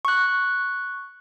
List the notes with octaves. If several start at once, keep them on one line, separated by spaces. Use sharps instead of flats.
C#6 F#6